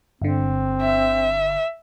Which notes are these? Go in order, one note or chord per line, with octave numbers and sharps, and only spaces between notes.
G1 D3 C4
E5